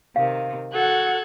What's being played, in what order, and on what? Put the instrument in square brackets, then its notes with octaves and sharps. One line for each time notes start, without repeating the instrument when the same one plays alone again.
[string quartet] C3 D#3 [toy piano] F5
[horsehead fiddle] F#4 F#5 [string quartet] A4 F#6 G#6